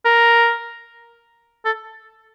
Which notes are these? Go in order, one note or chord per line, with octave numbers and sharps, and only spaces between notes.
A#4
A4